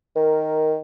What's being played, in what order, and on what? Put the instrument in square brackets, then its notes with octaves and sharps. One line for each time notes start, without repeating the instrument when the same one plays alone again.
[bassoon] D#3 [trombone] A#4